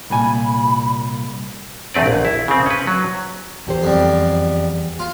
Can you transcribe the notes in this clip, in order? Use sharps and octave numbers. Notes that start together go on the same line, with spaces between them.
C2 A#2 G#5 B5
E2 A3 C4 B4 D5
A#1
E4
C#3 C4
C#4 B4
F#3
E2 G4 C5
F2 G3
F4